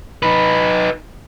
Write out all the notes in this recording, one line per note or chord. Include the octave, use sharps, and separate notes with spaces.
D#4 B4